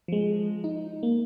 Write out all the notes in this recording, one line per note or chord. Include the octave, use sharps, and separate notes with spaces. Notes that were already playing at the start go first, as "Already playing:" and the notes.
F3 G#3
D#4
A#3